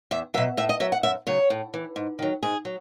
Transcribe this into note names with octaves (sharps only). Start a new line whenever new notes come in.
E2 E5
B2 F#3 E5
A2 E5
D#5
F#3 E5
F#5
F#2 E5
C#3 F#3 C#5
A2
E3
G#2
D#3 F#3
G#2 G#4
F#3